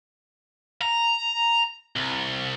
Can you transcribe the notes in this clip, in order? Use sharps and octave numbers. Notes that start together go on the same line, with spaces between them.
A#5
C2